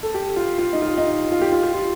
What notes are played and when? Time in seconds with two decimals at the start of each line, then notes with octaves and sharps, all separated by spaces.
0.03 A4
0.14 G4
0.36 F4
0.58 F4
0.73 D#4
0.82 F4
0.97 D#4
1.31 F4
1.42 G4
1.52 F4
1.63 G4
1.74 F4